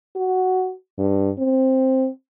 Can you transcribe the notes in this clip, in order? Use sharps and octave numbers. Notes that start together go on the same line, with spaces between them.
F#4
G2
C4